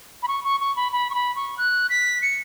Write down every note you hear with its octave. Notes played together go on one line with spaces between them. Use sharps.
B5
C#6
C#6
C#6
B5
B5
C#6
B5
C#6
F#6
B6
C#7